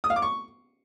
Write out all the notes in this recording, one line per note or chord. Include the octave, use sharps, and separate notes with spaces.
D#6
F5
D6
C#6